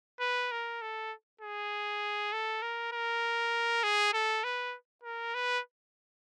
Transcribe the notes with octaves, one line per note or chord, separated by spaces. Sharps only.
B4
A#4
A4
G#4
A4
A#4
A#4
G#4
A4
B4
A#4
B4